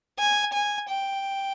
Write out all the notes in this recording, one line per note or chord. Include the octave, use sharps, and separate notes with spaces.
G#5
G#5
G5